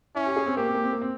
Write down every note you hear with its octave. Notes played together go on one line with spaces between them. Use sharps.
C#4 E4
G4
G#4
C4
A#3 G4
C4
A#3
C4
A#3
C4